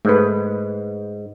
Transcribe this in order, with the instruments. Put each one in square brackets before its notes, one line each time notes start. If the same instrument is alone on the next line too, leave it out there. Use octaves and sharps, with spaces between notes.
[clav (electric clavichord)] G#2 [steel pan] A3 B4